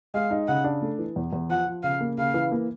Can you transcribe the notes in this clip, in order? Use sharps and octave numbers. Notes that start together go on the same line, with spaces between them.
G#3 F5
D#4
C#3 F#5
D4
A3
E3
E2
E2
F3 F#5
F3
C#3 F5
A#3
C#3 F5
E3
A#3